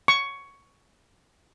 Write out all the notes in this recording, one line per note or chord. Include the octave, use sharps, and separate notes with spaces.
C#6